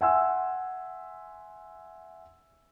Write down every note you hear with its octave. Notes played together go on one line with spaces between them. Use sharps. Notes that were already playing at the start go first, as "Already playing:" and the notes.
E5 F#5 G#5 C6 E6